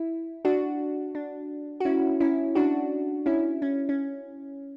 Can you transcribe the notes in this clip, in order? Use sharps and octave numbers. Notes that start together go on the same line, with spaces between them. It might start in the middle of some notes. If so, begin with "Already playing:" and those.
Already playing: E4
D4 F#4
D4
F#4
C#4 E4
C#4 E4
D4 F#4
C#4 E4
C#4
C#4